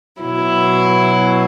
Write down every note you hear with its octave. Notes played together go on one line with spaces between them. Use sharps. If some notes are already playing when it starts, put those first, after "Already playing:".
B2 F#3 E4